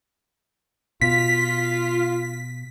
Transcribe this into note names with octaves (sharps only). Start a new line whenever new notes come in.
B2 F4 B6